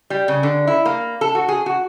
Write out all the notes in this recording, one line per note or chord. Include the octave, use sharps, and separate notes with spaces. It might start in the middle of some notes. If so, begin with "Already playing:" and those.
G3
C#3
D3
E4
A#3
A4
F#4
G#4
F#4